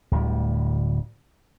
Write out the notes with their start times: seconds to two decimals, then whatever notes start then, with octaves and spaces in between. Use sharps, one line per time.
0.11 D1 D2 G3